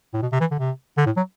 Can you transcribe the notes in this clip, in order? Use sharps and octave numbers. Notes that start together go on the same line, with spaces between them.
A2
B2
C3
E3
D3
C3
D3
A2
F#3